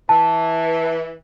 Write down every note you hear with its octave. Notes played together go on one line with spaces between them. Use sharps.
E3 A5